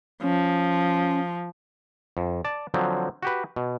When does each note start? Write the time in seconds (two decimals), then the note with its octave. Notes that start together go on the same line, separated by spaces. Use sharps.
0.23 F3 C#4
2.17 F2
2.45 D5 A5
2.74 D3 F3 F#3 C4
3.23 F#4 G4 B4
3.56 B2